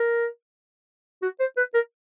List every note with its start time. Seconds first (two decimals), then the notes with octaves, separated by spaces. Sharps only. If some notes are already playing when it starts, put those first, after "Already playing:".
Already playing: A#4
1.22 F#4
1.40 C5
1.57 B4
1.74 A#4